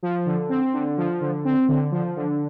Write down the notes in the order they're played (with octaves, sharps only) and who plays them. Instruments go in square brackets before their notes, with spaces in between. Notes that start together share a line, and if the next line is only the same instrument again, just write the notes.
[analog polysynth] F3
D3
C4
D3
F3
D3
C4
D3
F3
D3